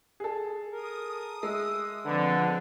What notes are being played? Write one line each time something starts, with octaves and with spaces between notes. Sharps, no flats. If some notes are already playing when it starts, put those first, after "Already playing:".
G#4 A4
A#4 D#6
G#3 E5
D3 F3 C4 B4